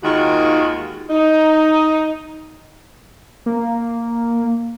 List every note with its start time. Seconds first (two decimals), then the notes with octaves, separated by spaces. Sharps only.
0.04 D#2 D#3 G#3 F4 F#4
1.10 D#4
3.46 A#3